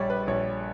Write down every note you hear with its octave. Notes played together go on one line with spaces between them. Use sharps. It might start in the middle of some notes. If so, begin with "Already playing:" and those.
Already playing: A#1 G3 C#5 D5
B4
A#1 C#5